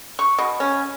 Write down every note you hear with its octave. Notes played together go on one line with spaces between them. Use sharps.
C#6
B2
C#4